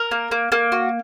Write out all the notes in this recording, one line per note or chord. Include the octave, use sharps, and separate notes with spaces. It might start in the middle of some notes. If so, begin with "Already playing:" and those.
Already playing: A#4
A#3
A#3
A#3
F#4